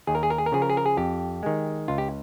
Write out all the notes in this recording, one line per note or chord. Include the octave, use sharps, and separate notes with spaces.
D#2 G#4
A#4
G#4
A#4
G#4
A#4
C#3 F3 G#4
A#4
G#4
A#4
G#4
F2 G4
D#3 G#3
C#2 F4
G4